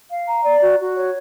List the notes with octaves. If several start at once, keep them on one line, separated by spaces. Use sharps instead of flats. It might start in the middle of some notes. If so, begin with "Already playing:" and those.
F5
A#5
D5
F#4
F#4
C#5